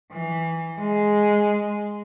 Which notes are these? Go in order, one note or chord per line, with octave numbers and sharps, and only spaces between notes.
E3
G#3